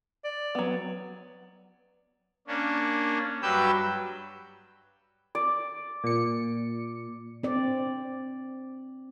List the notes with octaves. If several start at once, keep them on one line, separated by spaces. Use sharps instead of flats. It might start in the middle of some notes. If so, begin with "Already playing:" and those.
D5
F#3 B3
A#3 C#4 D4
G2 F#3 G4 B4 E6 G6
D5
A#2 C#7
C4 D5